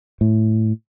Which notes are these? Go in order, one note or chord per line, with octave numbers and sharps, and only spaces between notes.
A2